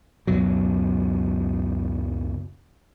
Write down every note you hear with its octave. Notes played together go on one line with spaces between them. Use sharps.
C#2 F#2 B2 F#3